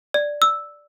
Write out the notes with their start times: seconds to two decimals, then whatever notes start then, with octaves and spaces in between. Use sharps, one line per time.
0.14 D5
0.42 E6